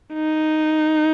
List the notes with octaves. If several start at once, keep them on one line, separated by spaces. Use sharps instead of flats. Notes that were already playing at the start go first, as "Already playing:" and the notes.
D#4